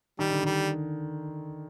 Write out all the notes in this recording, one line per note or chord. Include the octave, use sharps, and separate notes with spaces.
D#3 G3
D3
D#3 G3